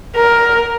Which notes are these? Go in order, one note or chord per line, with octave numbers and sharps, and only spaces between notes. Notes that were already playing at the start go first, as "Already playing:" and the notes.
A#4